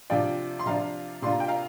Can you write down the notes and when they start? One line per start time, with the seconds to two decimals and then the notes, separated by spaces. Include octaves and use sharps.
0.10 C3 F3 D4 F4 D5 G5
0.59 C6
0.66 C3 F3 D4 F4 F5 A#5
1.22 C3 A#3 D4 F4 C6
1.32 A#5
1.40 G5
1.48 F5 A#5